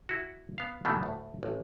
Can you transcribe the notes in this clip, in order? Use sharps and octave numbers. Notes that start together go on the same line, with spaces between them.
E4 F#4
B3 F5
B2 D#3 E3 G3 A3
D2 A2
A1